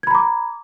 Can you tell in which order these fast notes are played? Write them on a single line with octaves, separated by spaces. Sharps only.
G#6 B5 A#5 D6